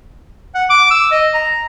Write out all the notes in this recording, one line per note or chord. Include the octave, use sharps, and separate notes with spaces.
F#5
D6
E6
D#5
A#5